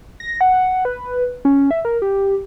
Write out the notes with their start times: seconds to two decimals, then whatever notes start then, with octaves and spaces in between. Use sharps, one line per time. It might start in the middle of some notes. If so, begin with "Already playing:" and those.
0.20 A#6
0.41 F#5
0.85 B4
1.45 C#4
1.71 E5
1.85 A#4
2.02 G4